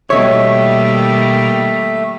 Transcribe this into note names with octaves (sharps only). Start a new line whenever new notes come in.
B2 D#3 G3 A3 A#3 C#5 E5